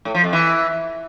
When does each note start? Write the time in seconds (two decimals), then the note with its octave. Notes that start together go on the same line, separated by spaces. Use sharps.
0.05 A2
0.14 F3
0.24 F2
0.33 E3